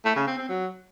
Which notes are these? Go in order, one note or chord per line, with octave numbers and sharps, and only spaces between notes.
A3
C#3
C4
C4
F#3